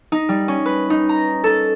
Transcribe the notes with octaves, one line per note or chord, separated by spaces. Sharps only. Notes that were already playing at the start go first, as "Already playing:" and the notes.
D#4
G3
C#4
B4
D#4
A#5
A4